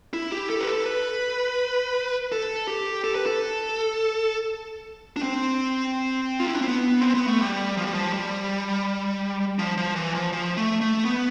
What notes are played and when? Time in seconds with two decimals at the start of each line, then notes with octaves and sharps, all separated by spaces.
0.13 E4
0.32 G4
0.50 A4
0.60 B4
0.67 A4
0.86 B4
2.32 A4
2.67 G4
3.04 A4
3.15 B4
3.26 A4
5.16 D4
5.23 C4
6.40 F4
6.48 E4
6.55 D4
6.61 C4
6.68 B3
7.01 C4
7.14 B3
7.27 A3
7.41 G3
7.77 F3
7.85 G3
7.94 F3
8.13 G3
9.59 F3
9.77 F3
9.96 E3
10.14 F3
10.33 F3
10.57 A3
10.81 A3
11.05 B3